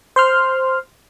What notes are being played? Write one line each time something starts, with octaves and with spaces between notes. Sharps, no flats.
C5 C6 F6